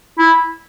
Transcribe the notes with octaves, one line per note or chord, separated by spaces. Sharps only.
E4